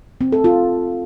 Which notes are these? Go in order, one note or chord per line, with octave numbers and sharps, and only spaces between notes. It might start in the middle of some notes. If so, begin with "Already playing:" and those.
C4
A4
F4